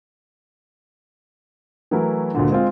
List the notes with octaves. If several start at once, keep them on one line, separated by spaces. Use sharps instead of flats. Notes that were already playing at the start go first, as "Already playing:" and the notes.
E3 F#3 A3 E4 F#4 A#4
D2 A#2 D3
G#3 C4 F4